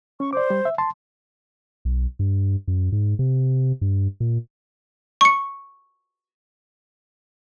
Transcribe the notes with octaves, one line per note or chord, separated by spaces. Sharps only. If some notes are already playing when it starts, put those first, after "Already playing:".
C#4 C#6
C5 D5 D6
G3
E5
A5 C6
B1
G2
F#2
G#2
C3
G2
A#2
C#6 C#7